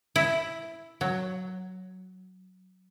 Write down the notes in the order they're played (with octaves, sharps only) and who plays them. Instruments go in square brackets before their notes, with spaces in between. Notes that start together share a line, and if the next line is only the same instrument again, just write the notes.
[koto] E4
F#3